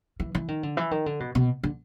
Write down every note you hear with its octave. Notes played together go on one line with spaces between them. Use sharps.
E3
E3
D#3
D3
E3
D#3
D3
B2
B2
D3